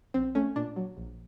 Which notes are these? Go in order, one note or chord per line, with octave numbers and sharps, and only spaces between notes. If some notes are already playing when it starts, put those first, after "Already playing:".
A#1 C4
A3 C#4
A#2 D4
F#3
A#1